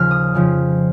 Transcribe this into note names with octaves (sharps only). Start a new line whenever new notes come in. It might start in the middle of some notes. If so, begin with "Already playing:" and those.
Already playing: D#2 C#3 F3 F6
D#6
F2 C#3 F3